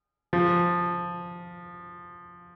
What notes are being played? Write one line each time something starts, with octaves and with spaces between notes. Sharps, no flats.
F3